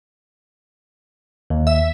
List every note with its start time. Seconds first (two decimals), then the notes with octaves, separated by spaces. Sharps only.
1.50 D#2
1.67 E5